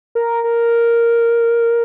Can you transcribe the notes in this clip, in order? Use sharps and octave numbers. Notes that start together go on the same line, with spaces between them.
A#4
A#4